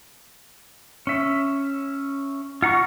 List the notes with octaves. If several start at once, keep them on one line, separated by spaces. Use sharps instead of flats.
C#4 E5
F4 F#5 A#5 C#6